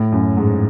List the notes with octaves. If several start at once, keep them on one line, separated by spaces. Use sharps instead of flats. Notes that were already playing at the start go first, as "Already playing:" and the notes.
Already playing: A2
F#2
G#2